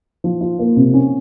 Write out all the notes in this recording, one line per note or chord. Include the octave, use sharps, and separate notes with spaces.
F3
F4
A#3
C3
C#4